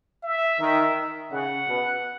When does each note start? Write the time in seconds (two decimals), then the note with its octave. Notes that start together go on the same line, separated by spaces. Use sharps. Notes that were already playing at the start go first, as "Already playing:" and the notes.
0.23 E5
0.60 D#3
1.32 C#3 F#5
1.68 B2